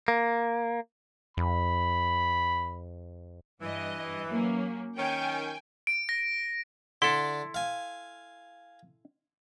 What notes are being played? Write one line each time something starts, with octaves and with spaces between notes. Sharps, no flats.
A#3
F2 B5
G2 E3 D#5
F#3 A#3 C#4
D#3 C#4 G5 G#5
D7
A#6
D3 D4 E4 A4 C6
F5 G#5